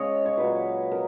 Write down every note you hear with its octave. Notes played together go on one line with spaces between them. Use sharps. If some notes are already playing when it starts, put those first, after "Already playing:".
Already playing: C#3 G#3 C#5 D#5 F5
C#5
A#2 F#3 B4
A#4